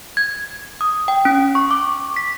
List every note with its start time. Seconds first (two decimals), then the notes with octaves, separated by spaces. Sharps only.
0.17 G#6
0.81 D#6
1.08 G5
1.25 C#4
1.55 C#6
1.71 D6
2.16 B6